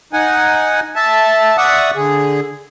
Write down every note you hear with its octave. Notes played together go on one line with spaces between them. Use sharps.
D#4 F#5 G#5
E5 A5
D5 E5 F#5 C#6 D#6
D3 G#4